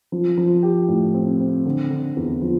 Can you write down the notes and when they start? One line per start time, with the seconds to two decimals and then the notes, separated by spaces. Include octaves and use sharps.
0.12 F3
0.37 F3
0.63 G4
0.88 A2
1.14 C4
1.40 C4
1.66 D3
1.90 D3
2.16 E2
2.42 F3